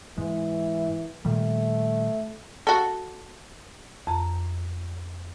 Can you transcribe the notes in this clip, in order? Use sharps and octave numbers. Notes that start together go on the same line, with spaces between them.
G#2 E3 G#3
A#2 D#3 G3 A3
F#4 A4
F2 A#5